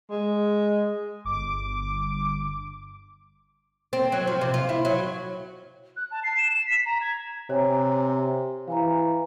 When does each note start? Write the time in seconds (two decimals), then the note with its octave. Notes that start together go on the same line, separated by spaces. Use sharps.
0.10 G#3
1.25 G1 D6
3.93 C4
4.12 F#3
4.27 F3
4.41 C3
4.54 F4
4.69 E4
4.85 F#3
5.96 F#6
6.11 A5
6.23 C7
6.37 E7
6.52 E7
6.67 B6
6.86 A#5
7.01 G#6
7.50 C3 C#5 G#5 A#5
8.68 E3 F5 G#5 A#5